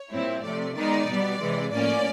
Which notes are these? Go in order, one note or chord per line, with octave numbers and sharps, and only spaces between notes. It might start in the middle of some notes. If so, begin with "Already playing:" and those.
Already playing: C#5
A#2 G3 C4 E4
C3 F3 A3 D5
D#3 G#3 B3 D#4 D5
B2 G3 B3
C3 E3 G#3
A2 F3 A#3 C#4 D5